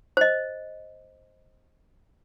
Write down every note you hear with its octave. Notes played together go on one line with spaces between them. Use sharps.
C5 D#5